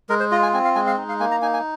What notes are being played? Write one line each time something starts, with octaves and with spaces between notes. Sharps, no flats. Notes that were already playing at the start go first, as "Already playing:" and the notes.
G#3 A#4
C5
F4 D#5
G#5
C4 G#5
F5
G#3 G#5
F5
D#4
F5
A#3 G#5
A#5
D#4 G#5
G#5